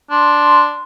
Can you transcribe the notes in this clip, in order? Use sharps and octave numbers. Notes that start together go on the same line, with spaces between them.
D4 C6